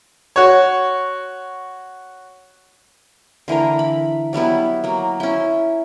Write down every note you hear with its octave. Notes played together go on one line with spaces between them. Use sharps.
F#4 C#5
D3 E3 A#3 A#4
B5
F#3 G3 B3 E4
F#3 A#3
C#4 E4